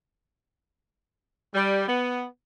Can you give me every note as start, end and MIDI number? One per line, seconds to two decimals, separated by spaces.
1.55 1.87 55
1.88 2.25 59